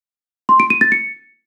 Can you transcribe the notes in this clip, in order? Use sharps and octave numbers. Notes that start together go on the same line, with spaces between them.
C6
D7
D#7
A6
C#7